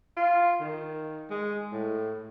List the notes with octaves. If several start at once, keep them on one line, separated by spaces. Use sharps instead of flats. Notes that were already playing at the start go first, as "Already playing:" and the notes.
F4
D#3
G#3
A2